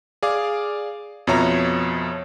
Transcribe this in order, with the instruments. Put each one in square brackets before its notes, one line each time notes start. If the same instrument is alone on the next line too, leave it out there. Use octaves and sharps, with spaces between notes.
[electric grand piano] G#4 D5 F5 D6
F2 B2 F3 C#5 E5 A#5